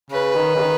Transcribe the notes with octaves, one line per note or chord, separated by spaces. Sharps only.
C#3 B4
D#3
C#3
D#3